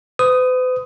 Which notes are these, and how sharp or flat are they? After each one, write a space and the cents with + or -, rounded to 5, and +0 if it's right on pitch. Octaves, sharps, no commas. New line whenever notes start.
B4 +45 D#6 +0